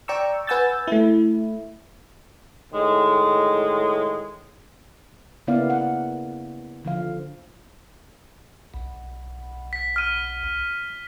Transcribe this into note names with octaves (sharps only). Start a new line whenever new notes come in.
D5 G5 A#5 C#6 E6
B4 F#5 G#5 E6 G6 A6
A3 E4
A2 D#3 G#3
C#3 A#3 B3 E4 D5 F5
F#5
D3 F3 F5
B1
B6
F6 D#7